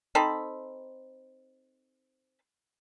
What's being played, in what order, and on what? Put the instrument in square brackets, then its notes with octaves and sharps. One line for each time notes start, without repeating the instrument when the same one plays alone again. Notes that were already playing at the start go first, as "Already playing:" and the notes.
[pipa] C4 D#4 A4 B5